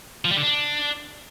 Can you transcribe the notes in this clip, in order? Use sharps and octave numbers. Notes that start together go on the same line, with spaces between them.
F3
G3
D3
D4